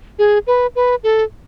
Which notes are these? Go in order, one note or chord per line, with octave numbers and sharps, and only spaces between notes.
G#4
B4
B4
A4